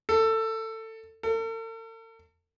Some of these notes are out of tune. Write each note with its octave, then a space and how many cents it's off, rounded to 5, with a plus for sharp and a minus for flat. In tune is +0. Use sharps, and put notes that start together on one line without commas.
A4 +20
A4 +45